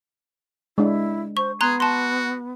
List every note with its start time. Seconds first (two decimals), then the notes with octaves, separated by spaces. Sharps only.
0.78 G#3 D4 E4
1.37 C5 C#6
1.61 B3 G#4 A#5 C6 F#6
1.80 F#4 A5 C6